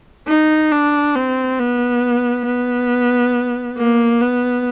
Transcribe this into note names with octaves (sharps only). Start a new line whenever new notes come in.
D#4
D4
C4
B3
B3
A#3
B3